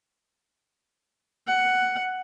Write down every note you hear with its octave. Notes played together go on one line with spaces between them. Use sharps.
F#5